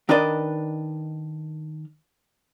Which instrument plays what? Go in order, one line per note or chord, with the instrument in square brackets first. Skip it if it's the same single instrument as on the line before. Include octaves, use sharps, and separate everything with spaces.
[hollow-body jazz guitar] D#3 D4 A#4 B4 D5 D#5